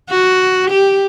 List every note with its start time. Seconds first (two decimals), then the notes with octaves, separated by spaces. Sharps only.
0.10 F#4
0.71 G4